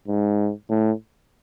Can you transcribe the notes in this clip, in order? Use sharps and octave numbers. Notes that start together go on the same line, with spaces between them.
G#2
A2